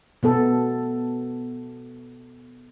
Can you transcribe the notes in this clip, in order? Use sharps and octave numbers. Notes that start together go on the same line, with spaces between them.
B2 B3 A4